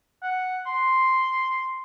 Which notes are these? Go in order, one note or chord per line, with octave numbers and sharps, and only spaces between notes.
F#5
C6